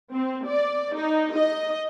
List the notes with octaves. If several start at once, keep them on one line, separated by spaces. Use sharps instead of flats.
C4
D5
D#4
D#5